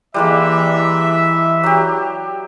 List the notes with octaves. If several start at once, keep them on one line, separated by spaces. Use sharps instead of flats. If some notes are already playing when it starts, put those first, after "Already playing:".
E3 G3 G#3 A#3 E5
F#3 G4